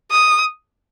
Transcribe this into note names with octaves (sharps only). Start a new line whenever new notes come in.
D#6